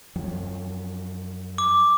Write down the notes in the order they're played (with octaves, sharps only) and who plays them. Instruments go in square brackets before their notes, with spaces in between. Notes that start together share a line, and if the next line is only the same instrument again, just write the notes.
[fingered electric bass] F#2 F3 F#3
[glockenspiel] D6